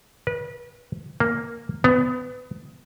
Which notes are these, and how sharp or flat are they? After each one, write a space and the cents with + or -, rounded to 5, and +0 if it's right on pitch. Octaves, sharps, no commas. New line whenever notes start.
B4 -30
A#3 -5
B3 +25